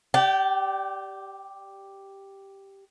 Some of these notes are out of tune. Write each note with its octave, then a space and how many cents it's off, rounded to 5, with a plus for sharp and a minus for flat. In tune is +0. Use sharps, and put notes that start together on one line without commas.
G4 +0 D5 +0 G5 -40